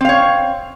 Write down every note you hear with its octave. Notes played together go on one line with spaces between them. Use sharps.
C4 C#5 F5